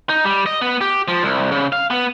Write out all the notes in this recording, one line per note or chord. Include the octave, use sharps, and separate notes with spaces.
D#4
G3
D#5
B3
G4
F3
C2
C#3
F5
B3